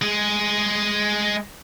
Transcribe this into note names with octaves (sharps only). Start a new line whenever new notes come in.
G#3 G#4